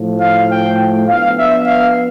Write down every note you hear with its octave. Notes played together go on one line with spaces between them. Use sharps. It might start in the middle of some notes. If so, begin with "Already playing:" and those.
Already playing: A2 F3 A3
F5
G5
F3 B3 D4 F5
E5
F5